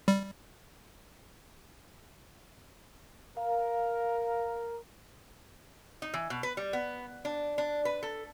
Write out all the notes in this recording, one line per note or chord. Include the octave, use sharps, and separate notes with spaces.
G3
A#4 F5
D#4
E3
B2
B4
G3
B3
D4
D4
B4
A4